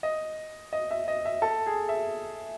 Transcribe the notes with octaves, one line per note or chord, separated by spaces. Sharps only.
D#5
D#5
E5
D#5
E5
A4
G#4
E5